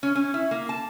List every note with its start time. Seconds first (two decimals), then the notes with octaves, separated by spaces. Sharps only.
0.03 C#4
0.15 C#4
0.34 E4
0.51 A#3
0.69 A5